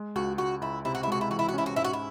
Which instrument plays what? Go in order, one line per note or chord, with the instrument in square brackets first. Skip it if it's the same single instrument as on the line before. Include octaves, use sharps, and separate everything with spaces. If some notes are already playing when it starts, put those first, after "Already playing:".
Already playing: [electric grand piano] G#3
[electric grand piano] C#2 [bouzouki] F#4
[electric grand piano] C#2 [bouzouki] F#4
[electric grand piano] C#2 [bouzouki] E4
[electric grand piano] C3 [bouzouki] E4
[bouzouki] F#4
E4
[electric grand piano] G#3 [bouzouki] F#4
[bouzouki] E4
[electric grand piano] E3 [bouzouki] F#4
[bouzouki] E4
F#4
[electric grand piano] C#4 [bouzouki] E4
[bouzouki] F#4
[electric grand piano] G#2 [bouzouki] E4
[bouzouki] F#4
E4